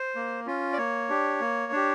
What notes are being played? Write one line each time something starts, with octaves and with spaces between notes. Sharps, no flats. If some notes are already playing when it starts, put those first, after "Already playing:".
Already playing: C5
A#3
C#4 F4
D5
A#3 C#5
D4 G4
A#3
D4 G4